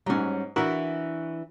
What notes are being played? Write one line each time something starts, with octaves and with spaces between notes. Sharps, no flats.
G#2 F#3 G3 C#4
E3 D4 E4 F#4 A#4